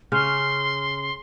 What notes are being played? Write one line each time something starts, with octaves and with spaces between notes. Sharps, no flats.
C#3 C#4 C6